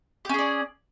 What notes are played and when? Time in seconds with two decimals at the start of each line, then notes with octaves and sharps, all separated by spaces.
0.25 G4
0.29 C#4
0.34 G#4
0.38 D5